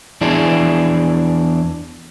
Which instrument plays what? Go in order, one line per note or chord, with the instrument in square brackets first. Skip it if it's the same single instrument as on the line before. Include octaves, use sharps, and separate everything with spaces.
[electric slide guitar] E2 D4 E4 G#4